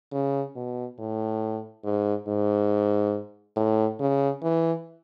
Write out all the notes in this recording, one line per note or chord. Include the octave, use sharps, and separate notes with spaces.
C#3
B2
A2
G#2
G#2
A2
C#3
E3